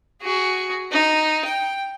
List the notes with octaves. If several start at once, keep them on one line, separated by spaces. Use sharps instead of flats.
F#4 G#4
D#4
G5